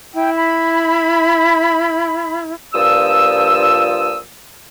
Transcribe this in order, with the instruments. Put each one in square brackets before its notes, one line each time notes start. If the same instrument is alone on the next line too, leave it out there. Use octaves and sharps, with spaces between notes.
[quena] E4 [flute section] G5
[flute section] B5
[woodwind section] G2 A#2 F3 D#6 E6